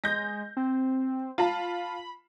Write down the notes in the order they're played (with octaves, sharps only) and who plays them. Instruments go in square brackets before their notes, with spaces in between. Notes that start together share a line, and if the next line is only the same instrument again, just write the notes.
[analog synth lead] G#3 [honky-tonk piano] G6 A#6
[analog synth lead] C4
[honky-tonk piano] F4 A5 [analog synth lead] B5